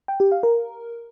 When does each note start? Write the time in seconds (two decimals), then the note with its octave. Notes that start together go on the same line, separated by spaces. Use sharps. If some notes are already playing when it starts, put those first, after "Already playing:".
0.08 G5
0.20 G4
0.32 F5
0.43 A#4